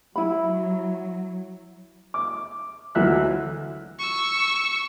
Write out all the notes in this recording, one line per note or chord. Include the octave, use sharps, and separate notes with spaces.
F#3 E4 B5
D6
D2 E3 F#3 E5 F#6
C#6 E6